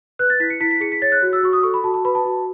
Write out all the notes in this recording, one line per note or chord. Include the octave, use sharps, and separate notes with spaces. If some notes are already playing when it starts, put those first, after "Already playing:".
B4 F#6
A6
E4 B6
C#7
E4 B6
B6
G#4 C#7
B6
C#5 A6
F#6
F#4
E6
F#4 C#6
D#6
A4 C#6
B5
F#4 A5
A5
B4 B5
A5
F#4